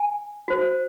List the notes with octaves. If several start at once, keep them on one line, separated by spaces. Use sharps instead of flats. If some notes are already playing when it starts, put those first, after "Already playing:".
Already playing: G#5
F#4 C5